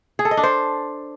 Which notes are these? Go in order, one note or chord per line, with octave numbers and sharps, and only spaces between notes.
G#4
A4
D#5
D4
C5